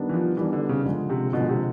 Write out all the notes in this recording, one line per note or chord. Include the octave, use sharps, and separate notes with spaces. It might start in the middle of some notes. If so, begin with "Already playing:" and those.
Already playing: D#3 G3 B3 D4
E3
F3
D#3 E3 G3 B3 D4
D3
C#3
D3 F3 G#3
C3
B2 D3 F3 G#3
C3